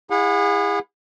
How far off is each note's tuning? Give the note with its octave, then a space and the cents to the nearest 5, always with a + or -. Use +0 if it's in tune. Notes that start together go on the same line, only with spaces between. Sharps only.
E4 +5 G#4 -35 F#5 -35